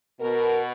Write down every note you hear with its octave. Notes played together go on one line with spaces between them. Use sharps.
B2 A#4